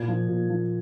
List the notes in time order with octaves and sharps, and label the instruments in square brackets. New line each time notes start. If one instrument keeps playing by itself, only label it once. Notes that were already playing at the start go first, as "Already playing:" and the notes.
Already playing: [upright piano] A#2 G#6
F3
A#2
F3